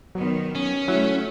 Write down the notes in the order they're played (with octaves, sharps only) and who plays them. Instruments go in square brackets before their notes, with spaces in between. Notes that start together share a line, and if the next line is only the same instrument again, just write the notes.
[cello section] D#3 B3 [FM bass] F#3
[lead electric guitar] C#4
[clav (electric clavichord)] F#3 [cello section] A3 E5 [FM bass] E4